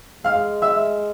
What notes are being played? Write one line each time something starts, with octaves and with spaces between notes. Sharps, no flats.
G#3 F5 F6
E5 E6